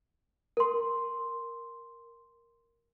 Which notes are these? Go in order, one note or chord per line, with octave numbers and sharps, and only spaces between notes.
A#4 C6